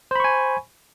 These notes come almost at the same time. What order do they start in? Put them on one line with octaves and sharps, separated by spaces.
C5 B5 C#6 G#5